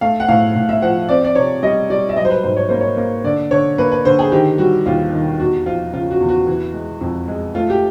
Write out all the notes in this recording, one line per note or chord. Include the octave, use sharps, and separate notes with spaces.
A3 F5
F#5
A2 F5
A2
E5
F3 F#5
C4 D5
D5
C3 C#5
G3 D#5
G3 D5
E5
F#3 D#5
C5
B4
G#2 C5
C#5
A#3 C5
C#5
A#3
D3 D5
D3 C#5
A#3 B4
B4
D3 C5
G#4
D#3 G4
G3 F#4
D#2 F4
D#3
E2 F#4
F3 F4
C#3 F4
F#4
E2
F#4
E3
G#3
F2
G#3
A3 F4
G4